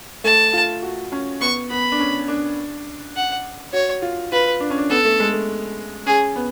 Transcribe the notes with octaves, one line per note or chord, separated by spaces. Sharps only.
A3 A5
F4
F#4
C#4
B3 C#6
B3 B5
D4
C#4
D4
F#5
F#4 C#5
F4
F4 B4
D4
C#4
D4
B3 A4
A3
G#3
A3
C#4 G#4
B3